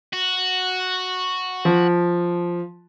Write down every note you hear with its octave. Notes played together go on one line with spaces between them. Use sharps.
F#4
F3